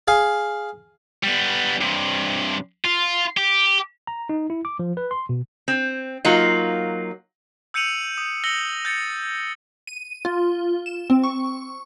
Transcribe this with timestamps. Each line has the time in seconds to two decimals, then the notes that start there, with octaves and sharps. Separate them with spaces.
0.08 G#4 F5 G#5
1.24 G3 B3
1.81 G2 C3
2.85 F4
3.37 G4
4.07 A#5
4.29 D#4
4.50 E4
4.65 D6
4.79 F3
4.97 B4
5.11 C6
5.29 B2
5.68 C4
6.25 F#3 A#3 D#4 F4
7.74 E6 G6 C#7 D#7 F7 F#7
8.18 D#6
8.44 E6 A#6 C#7 F#7 G7
8.85 G6 A6 C#7
9.87 D#7
10.25 F4
10.86 E7
11.10 C4
11.24 C#6